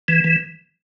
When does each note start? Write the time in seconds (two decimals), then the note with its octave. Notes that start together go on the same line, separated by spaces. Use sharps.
0.08 E3
0.24 E3